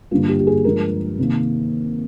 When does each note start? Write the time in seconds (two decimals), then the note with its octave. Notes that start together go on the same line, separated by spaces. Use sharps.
0.11 G2 D3 G3 A#3 F4
0.29 G4
0.40 G4
0.47 G#4
0.65 G2 F3 G#3 A#4
1.18 C3 D#3 A#3